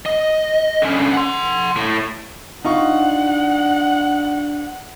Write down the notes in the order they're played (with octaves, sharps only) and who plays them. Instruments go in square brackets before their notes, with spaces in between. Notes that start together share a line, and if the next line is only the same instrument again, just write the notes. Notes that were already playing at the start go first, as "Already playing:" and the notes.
[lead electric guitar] D#5
D3 C#4
F#5 C6
A2
[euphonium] D4 [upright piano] D#4 F4 C#6 [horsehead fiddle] F#5